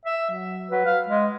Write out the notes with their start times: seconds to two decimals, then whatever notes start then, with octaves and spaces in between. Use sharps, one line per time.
0.05 E5
0.31 F#3
0.70 F#3 B4
0.85 F5
1.08 G#3 D#5